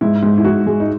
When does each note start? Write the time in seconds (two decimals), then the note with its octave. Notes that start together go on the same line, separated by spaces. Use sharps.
0.01 G#2 E4
0.23 G#2
0.38 E4
0.44 G#2 F#4
0.66 G#2 G#4
0.80 D#4